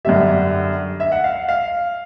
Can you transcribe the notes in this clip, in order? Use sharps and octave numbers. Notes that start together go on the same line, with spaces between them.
F#2 D3 G3 E5
E5
F#5
F5
F5